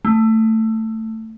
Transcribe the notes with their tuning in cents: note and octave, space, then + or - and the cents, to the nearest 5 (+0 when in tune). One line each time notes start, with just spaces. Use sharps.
A3 +15